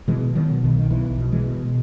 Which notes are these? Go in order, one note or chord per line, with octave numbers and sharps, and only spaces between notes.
B2 E3 G#3
B2 D#3 F#3
B1 D#3
D#3
B1 E3
B2
E3 G#3
B2